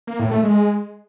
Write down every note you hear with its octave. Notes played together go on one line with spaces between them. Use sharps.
A#3
A2
A3
G#3